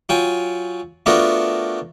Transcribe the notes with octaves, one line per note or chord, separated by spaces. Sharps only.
F#3 F4 G5 G#5
A3 B3 D4 F4 F#4 A#4